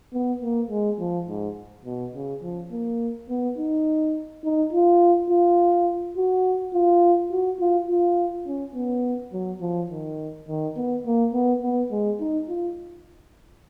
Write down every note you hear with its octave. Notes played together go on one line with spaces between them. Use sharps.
B3
A#3
G#3
F3
G#2
B2
C#3
F3
A#3
B3
D#4
D#4
F4
F4
F#4
F4
F#4
F4
F4
C#4
B3
F#3
F3
D#3
D#3
B3
A#3
B3
B3
G#3
D#4
F4